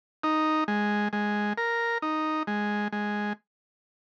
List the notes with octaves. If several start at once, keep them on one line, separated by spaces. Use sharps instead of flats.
D#4
G#3
G#3
A#4
D#4
G#3
G#3